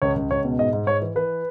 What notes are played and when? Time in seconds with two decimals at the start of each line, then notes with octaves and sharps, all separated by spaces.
0.02 C#2 C#5
0.16 C#2
0.31 C#2 C#5
0.45 B2
0.59 G#2 D#5
0.73 G#2
0.87 G#2 C#5
1.02 E3
1.15 E3 B4